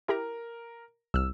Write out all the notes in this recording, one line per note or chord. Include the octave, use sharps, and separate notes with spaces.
E4 G4 A#4 A#5
C2 E6 F6